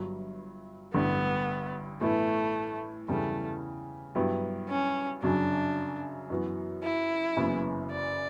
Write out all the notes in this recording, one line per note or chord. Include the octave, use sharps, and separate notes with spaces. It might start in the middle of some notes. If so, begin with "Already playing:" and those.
Already playing: G1 G2 F#3
A1 G2 D3 B3
A2 E3 A3 B3 E4
E2 C#3 E3 G3 A3
G2 F#3 B3 E4 G4
C#4
F#2 C#3 F#3 D4
F#2 E3 B3 F#4
E4
F#1 F#2 C#3 E3 B3
D5